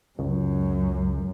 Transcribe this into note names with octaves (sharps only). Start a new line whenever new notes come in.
C#2 F#2